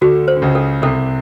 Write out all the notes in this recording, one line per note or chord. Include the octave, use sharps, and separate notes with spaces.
D2 D3 F#4
C5
D3
C#2 C#3
A4
C2 C3 A4